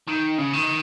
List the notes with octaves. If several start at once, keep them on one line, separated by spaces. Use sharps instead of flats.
D#3
C#3
D#3